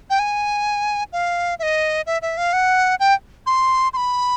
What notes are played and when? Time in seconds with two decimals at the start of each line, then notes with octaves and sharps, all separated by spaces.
0.10 G5
0.19 G#5
1.13 F5
1.59 E5
1.63 D#5
2.06 E5
2.22 E5
2.37 F5
2.53 F#5
3.00 G5
3.46 C6
3.93 C6
3.97 B5